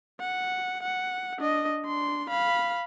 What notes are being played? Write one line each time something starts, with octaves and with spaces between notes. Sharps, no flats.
F#5
F#5
D4 D#5
D4 C6
F5 B5